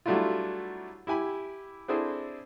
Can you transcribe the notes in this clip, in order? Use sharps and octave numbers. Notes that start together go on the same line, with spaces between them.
F#3 G3 A3 D4 E4 F4
E4 G4 G#5 B5
C4 D4 E4 G#4 A4 C5